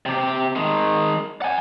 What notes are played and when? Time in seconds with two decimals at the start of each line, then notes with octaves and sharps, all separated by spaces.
0.06 C3 G4
0.56 D#3 G#3
1.42 F#5 G#5